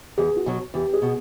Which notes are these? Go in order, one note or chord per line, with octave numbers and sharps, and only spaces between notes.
E2 G#4
F#4
B2 F#3
E2 G4
G#4
B2